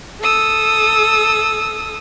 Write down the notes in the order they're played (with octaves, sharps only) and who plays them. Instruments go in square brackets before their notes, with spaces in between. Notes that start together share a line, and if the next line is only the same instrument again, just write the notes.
[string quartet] A4 D#6 E6